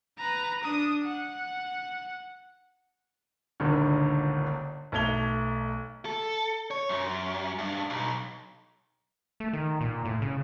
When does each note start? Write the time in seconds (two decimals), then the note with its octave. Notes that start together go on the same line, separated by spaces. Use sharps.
0.18 B4 A#5
0.63 D4 D#6
1.04 F#5
3.60 G1 C#2 A#2 D3 D#3
4.92 B1 A3 A5 G#6 F7 G7
6.05 A4
6.71 C#5
6.89 F#2
7.59 G2
7.90 B1
9.40 A3
9.53 D#3
9.81 A#2
10.05 A2
10.22 C#3